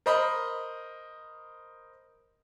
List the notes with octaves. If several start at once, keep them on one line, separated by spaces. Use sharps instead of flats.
A#4 C5 D#5 B5